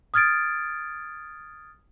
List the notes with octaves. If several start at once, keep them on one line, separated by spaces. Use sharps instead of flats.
D#6 F6 G#6 A6 D7